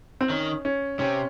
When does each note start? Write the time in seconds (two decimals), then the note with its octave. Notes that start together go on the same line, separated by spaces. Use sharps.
0.21 C4
0.29 D#3 C#4
0.65 C#4
0.99 C3 C#4